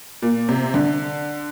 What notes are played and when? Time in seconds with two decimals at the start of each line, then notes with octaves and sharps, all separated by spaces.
0.22 A#2
0.49 C3
0.74 D3